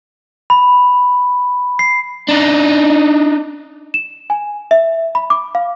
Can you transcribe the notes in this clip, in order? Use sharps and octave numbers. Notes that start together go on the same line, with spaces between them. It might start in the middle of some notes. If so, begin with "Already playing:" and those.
B5
C7
D4 D#4
E7
G#5
E5
B5
D6
F5